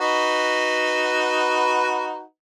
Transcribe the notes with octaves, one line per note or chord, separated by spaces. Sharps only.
D#4 F#4 B4